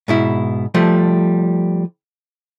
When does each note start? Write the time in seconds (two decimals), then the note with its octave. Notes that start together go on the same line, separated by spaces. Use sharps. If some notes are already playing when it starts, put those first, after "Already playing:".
0.08 G#2 B2 E4
0.74 F3 G3 A3